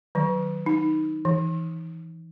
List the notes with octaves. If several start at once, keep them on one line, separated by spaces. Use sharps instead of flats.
D#3 F#3
D#4
E3